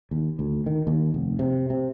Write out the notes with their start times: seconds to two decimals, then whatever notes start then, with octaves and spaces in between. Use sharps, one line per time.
0.11 D#2
0.39 D2
0.66 D#3
0.87 D#2
1.14 F1
1.39 C3
1.70 C3